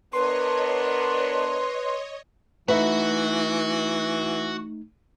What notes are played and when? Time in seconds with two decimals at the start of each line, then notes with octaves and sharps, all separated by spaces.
0.13 B3 D4 A#4 B4 C#5 D#5 C6
2.68 E3 A3 D#4 F#4 B4 E5 F#5